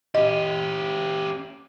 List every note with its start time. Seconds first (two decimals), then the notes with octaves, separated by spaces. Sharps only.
0.15 C#4 G4 D#5